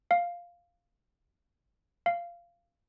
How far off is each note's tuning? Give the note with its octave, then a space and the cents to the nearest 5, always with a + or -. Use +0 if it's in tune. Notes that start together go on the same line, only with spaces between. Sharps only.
F5 +0
F5 -15